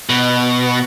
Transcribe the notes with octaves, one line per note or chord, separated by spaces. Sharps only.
B2